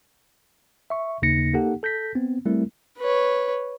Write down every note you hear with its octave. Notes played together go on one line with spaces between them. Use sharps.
E5 C#6
D#2 C#3 A#3 D#4 A#6 C#7
A#3 D#4 G4 A4 F#5
A4 G6 A#6 B6
B3 C4
G3 A3 C4 E4 A#4
B4 C#5